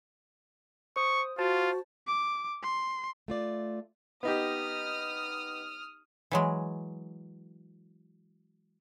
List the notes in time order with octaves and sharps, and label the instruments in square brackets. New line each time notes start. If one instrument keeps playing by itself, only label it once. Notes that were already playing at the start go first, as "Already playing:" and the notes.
[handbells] C5 D#6 [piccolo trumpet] C#6
[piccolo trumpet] F4 [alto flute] F#4 [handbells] C5 A5 A6
[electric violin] D6
C6
[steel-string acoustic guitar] A3 F4 D5
[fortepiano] B3 D#4 G4 [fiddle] D#6 F6
[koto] E3 F#3 G#3